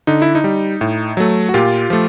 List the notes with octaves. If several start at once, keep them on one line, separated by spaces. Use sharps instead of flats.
D3 D#4
E4
D#4
G3
A2
F#3 A3
F#4
A#2 F4 G4
F3 A3